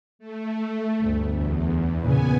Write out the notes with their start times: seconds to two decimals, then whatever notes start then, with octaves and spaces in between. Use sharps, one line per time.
0.19 A3
1.01 G1 D2
1.31 E2
2.01 A#2 C#3 B3 G#5